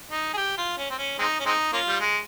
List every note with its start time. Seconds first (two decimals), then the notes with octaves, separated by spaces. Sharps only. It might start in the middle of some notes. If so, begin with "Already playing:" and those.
0.11 D#4
0.33 G#4
0.37 G4
0.57 F4
0.78 C#4
0.90 C4
0.98 C#4
1.19 G#3 C4 D#4
1.40 C#4
1.45 G#3 C4 D#4
1.73 A#3 C#4 F4
1.88 G3
2.00 G#3